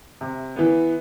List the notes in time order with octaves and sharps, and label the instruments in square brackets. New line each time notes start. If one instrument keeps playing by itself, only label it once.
[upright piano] C3
E3 B3